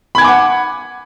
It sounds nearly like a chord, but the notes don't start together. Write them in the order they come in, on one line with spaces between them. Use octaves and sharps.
B5 G#6 G#5 D6 F#5